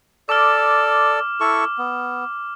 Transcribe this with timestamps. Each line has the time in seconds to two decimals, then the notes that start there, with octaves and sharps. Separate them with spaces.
0.29 A4 D5 D6 F6
1.41 E4 A4 C#6
1.78 B3